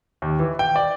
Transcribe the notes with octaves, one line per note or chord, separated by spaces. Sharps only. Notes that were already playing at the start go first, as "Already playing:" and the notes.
D#2
E3
G5
D5